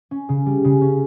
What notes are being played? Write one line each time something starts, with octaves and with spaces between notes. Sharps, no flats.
C#4
C#3
G3
C#3
C#4